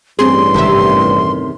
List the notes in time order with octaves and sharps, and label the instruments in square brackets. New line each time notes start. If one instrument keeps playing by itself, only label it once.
[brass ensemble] A1 G2 [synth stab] C4 G#4 [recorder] C6
[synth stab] G#1 E5 [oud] E2 C3 D#3